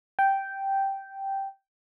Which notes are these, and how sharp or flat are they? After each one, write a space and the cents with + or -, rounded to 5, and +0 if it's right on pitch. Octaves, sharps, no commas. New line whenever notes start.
G5 -5